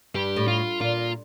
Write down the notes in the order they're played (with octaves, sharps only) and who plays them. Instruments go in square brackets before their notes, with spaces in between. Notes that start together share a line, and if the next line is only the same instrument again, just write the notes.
[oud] G2 [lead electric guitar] G4
[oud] A2
[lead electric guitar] F4
[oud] A#2 [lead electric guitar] F4